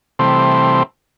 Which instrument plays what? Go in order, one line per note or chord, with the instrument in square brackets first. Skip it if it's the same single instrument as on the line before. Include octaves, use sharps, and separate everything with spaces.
[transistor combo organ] C3 E3 G3 A3 C4